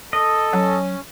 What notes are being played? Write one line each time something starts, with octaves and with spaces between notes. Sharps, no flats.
A4 D#5
F#3 C#4